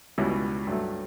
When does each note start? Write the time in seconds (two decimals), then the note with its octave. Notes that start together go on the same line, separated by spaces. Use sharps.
0.18 C#2 B2 G3 C#4 E4
0.67 G2 F#3 A3